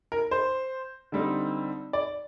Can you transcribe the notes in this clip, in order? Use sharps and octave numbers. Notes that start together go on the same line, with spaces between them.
A#4
C5
D3 G3 C4 D#4
D5